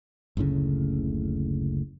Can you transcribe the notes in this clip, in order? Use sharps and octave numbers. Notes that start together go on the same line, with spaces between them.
F#1 D2 A2 C#3